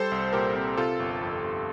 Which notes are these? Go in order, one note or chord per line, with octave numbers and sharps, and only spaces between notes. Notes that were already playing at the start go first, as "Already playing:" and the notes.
Already playing: G3 A4 C5
C2
A#2 G4 A#4
C4
C3 F4 A4
G1
F2
G1